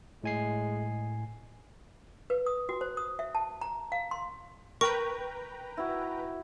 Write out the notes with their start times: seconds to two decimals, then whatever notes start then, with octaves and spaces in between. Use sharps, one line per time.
0.24 A2 G#3 G#5 C7
2.30 B4
2.46 D#6
2.69 F#4
2.81 C5
2.97 D#6
3.19 E5
3.35 A5
3.61 A#5
3.92 F5
4.11 C6
4.81 A#4 B4 G5 A#5 C#6
5.77 E4 F#4